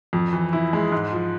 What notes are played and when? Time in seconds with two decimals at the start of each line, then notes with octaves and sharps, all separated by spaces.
0.13 F2
0.33 E3
0.53 E4
0.73 G#3
0.92 G#2
1.12 F3